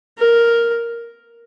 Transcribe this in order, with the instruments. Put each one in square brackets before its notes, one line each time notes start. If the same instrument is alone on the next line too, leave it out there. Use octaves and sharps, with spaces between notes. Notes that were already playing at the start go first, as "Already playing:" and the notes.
[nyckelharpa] A#4